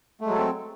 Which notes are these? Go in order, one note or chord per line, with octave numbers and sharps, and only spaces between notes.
F#3 G#3 A3 C4 A4